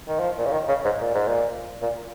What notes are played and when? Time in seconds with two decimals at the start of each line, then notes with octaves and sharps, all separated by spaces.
0.08 D#3
0.20 F3
0.38 A#2
0.46 C#3
0.52 D#3
0.69 C#3
0.85 G#2
1.01 A#2
1.15 G#2
1.28 A#2
1.82 A#2